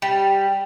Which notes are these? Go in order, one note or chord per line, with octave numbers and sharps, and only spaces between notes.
G3